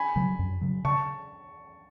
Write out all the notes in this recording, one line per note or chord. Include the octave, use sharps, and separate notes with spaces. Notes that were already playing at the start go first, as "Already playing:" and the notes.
Already playing: G#5 B5
C#3 F#3
F#2
C#3 F#3
C#3 A5 C#6